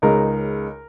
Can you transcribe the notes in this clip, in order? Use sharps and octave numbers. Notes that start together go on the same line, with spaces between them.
C#2 C#3 G#3 D#4 A#4